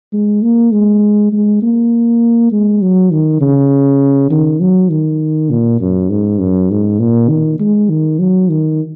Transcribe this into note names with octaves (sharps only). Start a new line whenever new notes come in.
G#3
A#3
G#3
G#3
A#3
G#3
F#3
D#3
C#3
D#3
F#3
D#3
A#2
F#2
G#2
F#2
G#2
A#2
D#3
G#3
D#3
F#3
D#3